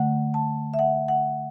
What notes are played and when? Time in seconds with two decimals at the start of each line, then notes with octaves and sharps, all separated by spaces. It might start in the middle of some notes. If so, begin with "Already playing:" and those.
Already playing: D3 A3 F#5
0.34 A5
0.74 E5
0.79 F#5
1.08 F#5